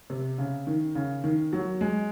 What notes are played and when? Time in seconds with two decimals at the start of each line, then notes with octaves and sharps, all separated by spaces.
0.10 C3
0.38 C#3
0.67 D#3
0.95 C#3
1.24 D#3
1.53 F#3
1.81 G#3